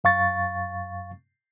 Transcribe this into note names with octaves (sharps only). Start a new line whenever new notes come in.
F#2 F5 C#6 A6